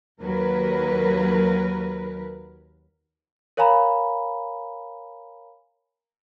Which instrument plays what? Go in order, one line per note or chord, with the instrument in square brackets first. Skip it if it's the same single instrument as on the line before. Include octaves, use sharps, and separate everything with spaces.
[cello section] D#2 F#3 A#4 B4
[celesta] A#4 C#5 F5 G#5 A#5 B5